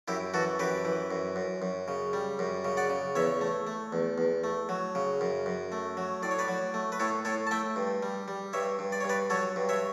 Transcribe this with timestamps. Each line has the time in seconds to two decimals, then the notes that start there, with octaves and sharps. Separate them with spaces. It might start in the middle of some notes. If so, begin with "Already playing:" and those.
0.08 F#2 E4 G4
0.34 E3 F#4 A4
0.59 F#2 G4 B4
0.85 E3
1.11 F#2
1.36 F#2
1.62 F#2
1.88 C#3
2.13 G3
2.39 F#2
2.65 C#3
2.77 D5 F#5
2.90 C#3
3.15 E2 C#5 E5
3.41 A3
3.67 A3
3.93 E2
4.18 E2
4.44 A3
4.69 F#3
4.95 C#3
5.21 F#2
5.46 F#2
5.72 A3
5.97 F#3
6.23 A2 D5
6.31 C#5
6.39 B4 D5
6.48 F#3
6.74 A3
6.92 B4
7.00 A2 A4 C#5
7.25 A2 A4 C#5
7.47 A5
7.51 A3 E5 G5
7.76 G2
8.03 G3
8.28 G3
8.53 G2 C#5 E5
8.79 G2
8.92 D5
9.01 C#5
9.05 G2 B4 D5
9.30 F#3 A4 C#5
9.56 G2
9.69 C#5 E5